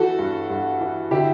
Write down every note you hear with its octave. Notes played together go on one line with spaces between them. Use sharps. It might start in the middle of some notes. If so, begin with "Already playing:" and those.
Already playing: E3 F#4 A4
G2
G2
E3
D3 E4 G4